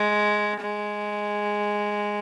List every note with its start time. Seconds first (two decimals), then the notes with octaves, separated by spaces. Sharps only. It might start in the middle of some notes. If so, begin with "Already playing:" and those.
Already playing: G#3
0.61 G#3